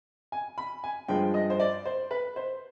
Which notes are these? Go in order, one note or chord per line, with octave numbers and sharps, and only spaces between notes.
G#5
B5
G#5
G2 F3 G#3 G5
D#5
C5
D5
C5
B4
C5